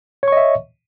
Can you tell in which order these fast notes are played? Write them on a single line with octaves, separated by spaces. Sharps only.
C#5 C#6 D#5 E5